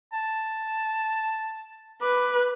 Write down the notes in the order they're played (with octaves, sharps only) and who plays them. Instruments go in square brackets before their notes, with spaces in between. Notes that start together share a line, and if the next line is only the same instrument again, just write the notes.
[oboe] A5
[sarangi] B4 [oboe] D6